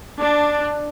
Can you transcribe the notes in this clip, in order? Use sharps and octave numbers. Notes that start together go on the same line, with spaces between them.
D4